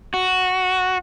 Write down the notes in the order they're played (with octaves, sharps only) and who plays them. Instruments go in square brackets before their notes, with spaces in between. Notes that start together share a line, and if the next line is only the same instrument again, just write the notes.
[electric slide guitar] F#4